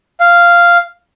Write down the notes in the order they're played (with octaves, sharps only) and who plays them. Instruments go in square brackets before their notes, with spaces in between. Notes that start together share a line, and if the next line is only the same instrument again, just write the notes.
[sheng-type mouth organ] F5